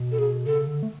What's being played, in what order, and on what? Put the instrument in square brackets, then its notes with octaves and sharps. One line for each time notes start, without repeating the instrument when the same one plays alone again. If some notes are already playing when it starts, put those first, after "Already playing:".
Already playing: [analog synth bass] B2
[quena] A4
G#4
[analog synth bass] C#3 [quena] A4
[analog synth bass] D3
A3